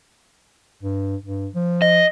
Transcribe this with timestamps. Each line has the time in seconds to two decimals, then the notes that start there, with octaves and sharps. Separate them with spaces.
0.83 G2
1.26 G2
1.55 F3
1.82 D#5